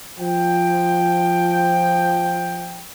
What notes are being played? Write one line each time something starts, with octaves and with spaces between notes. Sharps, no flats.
F3 G5